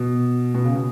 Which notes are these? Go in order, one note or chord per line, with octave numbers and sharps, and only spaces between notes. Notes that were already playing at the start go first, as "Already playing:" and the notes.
Already playing: B2
B2
C#3
B2